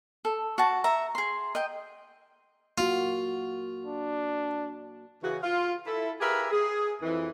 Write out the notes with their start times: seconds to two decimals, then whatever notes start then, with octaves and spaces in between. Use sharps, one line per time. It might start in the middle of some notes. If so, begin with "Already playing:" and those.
0.25 A4
0.58 F#4 A5
0.84 E5 A#5
1.15 G#4 C6
1.55 D#5 G5
2.78 A#3 F4 F#4
3.86 D4
5.22 C#3 E3 F#4
5.43 F4
5.87 E4 A4
6.20 G4 G#4 A#4 B4 E5 F5
6.51 G#4
7.01 F2 E3